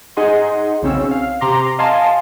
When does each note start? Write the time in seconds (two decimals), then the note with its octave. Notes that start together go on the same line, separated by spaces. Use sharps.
0.17 D#4 G#4 D#5 F#5 C6
0.82 B1 C#3 C4 C#4 E6
1.11 F5
1.41 C3 A#5 C6 D6 A#6
1.78 D#5 F5 G#5 A5 C6